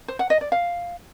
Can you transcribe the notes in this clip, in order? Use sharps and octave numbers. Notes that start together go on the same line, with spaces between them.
C5
F#5
D#5
D5
F5